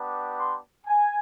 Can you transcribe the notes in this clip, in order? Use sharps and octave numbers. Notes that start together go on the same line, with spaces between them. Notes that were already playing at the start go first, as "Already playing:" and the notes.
Already playing: B3 D4 G4
C6
G#5